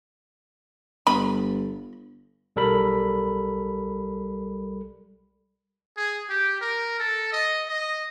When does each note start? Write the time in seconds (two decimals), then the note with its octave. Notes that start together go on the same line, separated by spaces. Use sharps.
1.07 G1 B5
2.56 B1 G3 A4 A#4 B5
5.97 G#4
6.29 G4
6.61 A#4
7.00 A4
7.33 D#5
7.68 D#5